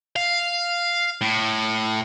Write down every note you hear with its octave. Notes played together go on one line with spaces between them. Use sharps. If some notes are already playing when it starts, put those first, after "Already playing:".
F5
A2